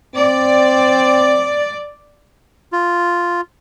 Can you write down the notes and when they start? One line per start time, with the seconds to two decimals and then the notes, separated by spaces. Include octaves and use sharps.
0.15 C4 D5
2.73 F4